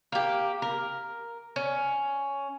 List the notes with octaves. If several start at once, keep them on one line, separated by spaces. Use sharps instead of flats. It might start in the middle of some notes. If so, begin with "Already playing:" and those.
A#3 G4
A#4
C#4